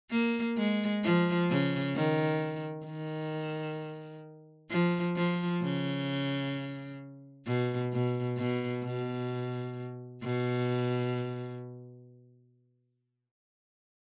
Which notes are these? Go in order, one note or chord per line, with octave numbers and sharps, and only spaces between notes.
A#3
G#3
F3
C#3
D#3
D#3
F3
F3
C#3
B2
B2
B2
B2
B2